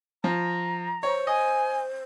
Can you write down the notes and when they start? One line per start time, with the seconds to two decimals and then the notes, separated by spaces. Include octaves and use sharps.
0.24 F3 A#5
1.03 C5 C#5
1.27 D#5 G#5